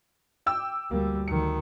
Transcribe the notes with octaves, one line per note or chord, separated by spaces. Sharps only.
G5 D6 E6
D2 G3 A#3
D2 D#3 C#7